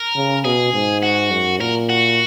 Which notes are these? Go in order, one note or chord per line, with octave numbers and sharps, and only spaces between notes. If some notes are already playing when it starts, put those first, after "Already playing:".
Already playing: A#4
C#3
B2 G#4
G#2
F#4
F#2
A#2 A#4
F#4